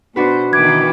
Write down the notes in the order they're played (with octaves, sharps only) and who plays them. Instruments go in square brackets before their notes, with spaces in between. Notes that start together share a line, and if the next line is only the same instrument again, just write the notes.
[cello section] B2 C5 [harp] D4 F#4 B4
[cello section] B2 D#3 E3 [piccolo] D6 [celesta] G#6